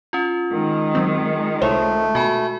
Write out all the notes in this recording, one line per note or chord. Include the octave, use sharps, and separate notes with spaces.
C#4 F4
D#3 G#3
F#3 C4
C2 A3 C5 C#5
B2 F#4 G#5 B5